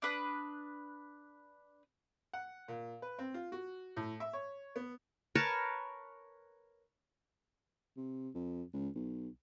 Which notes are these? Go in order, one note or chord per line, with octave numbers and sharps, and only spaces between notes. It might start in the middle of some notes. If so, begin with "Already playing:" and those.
D4 B4 D#6
F#5
A#2
B4
C4
F4
F#4
A2
E5
C#5
B3
A#4 B4 C#5 A5
C3
F2
C#2
B1